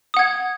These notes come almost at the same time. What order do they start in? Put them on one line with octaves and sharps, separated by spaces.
D#6 F#5 G#6